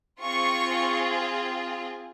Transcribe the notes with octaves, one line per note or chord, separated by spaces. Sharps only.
C4 F4 G#4 C#6